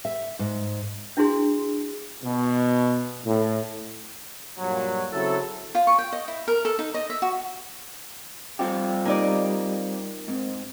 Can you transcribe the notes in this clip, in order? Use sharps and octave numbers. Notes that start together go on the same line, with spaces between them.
E5
G#2
D4 E4 F#4 G#4 C6
B2
A2
G2 A#2 F#3
C#3 F#3 C4 E4 A4
F4
C#6
G5
D#5
E4
A#4
A4
D#4
D#5
E5
F#4
G3 C4 F4 G4
A#3 D#4 D5
G#2 C4